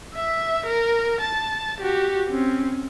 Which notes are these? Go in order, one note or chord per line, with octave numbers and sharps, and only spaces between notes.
E5
A#4
A5
F#4 G4
C4 C#4